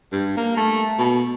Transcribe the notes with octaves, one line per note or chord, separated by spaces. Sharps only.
G2
A#3
A3
B2